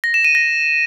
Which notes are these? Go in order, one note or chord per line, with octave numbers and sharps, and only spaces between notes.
A#6
E7
D#7
A#6